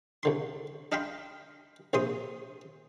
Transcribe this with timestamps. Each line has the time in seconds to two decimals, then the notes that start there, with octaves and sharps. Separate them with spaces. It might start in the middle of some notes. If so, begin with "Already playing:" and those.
0.23 C2 D3 C6
0.92 D4 D#5 F5 G5 B5 C6
1.93 A#1 C3 C5 C6 D#6